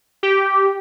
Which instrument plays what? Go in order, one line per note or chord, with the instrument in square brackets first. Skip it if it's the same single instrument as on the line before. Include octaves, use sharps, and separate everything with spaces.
[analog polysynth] G4